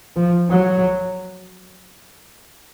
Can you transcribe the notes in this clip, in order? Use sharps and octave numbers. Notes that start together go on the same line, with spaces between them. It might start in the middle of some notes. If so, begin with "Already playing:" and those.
F3
F#3